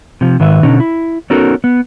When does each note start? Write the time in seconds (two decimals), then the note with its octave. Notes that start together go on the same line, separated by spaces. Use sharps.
0.21 C3 F3
0.40 G#2 D#3 B4 E5
0.63 B2 D3 C#4 D#4
0.80 E4
1.30 B3 C#4 D#4 F#4 A4 A#4
1.64 B3